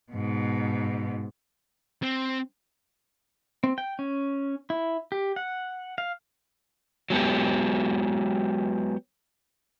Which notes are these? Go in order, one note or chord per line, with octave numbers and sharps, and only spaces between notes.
G#2 B2
C4
C4
G5
C#4
E4
G4
F#5
F5
F#3 G#3 B3 G4